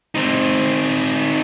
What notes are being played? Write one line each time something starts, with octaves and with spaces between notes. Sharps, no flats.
C4 D#4